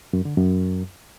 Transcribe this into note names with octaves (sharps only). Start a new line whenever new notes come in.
F#2
D3
F#2